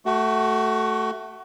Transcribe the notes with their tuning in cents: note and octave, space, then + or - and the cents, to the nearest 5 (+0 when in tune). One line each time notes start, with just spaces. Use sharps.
A3 +0 F#4 +25